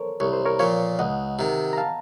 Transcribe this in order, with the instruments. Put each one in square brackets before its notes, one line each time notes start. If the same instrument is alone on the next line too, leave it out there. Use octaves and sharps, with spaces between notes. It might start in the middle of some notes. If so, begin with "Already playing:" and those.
Already playing: [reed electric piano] A4 A#4 C5 C#5
[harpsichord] C2 [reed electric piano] C#5
[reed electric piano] C5
A#4 C#5
[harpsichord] A#2 F3 [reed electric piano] C#5 F5
[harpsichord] C#2 [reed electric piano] D#5 F#5
[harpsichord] C3 D#3
[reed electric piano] A#5
F5 A5